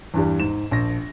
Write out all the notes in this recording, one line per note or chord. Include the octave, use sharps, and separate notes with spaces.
E2 G2 G3
G#2 E7
A#1 A#6